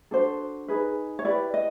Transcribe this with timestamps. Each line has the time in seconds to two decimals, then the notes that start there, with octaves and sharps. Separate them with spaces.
0.11 D4 F#4 A4 C5
0.68 D#4 G#4 B4
1.19 C#5
1.25 E4 G4 B4 D5
1.54 D#5